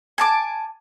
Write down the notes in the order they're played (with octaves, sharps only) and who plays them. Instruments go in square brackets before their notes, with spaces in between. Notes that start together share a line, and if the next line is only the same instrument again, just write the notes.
[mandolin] G#5 A5 D6